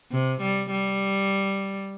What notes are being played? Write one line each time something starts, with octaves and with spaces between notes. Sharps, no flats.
C3
G3
G3